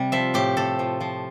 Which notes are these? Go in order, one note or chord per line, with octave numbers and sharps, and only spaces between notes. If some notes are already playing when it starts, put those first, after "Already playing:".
Already playing: C3 G3
F3 E5
A2 G4
A2 A4
F3
F3